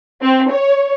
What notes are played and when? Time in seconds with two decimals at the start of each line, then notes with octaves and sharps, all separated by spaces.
0.22 C4
0.51 C#5